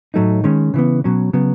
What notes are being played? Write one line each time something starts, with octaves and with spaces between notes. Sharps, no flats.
A2 F#3 A3 D#4
D#3 G#3 C#4
C#3 E3 B3
B2 F#3 C#4
C#3 F#3 B3